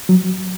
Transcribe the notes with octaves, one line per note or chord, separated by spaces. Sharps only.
F#3